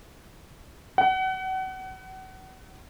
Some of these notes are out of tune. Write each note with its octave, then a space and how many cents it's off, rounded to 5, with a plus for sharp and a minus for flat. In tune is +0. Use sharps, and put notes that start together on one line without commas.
F#5 +35